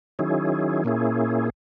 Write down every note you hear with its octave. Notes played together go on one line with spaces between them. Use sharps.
D#3 F#3 C#4 E4 G#4
A#2 A#3 C#4 E4 G#4